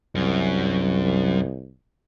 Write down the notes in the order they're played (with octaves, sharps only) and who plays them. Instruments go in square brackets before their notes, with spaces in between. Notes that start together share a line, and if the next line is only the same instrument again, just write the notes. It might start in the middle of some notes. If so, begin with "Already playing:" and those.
[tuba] C2 [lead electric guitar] F#2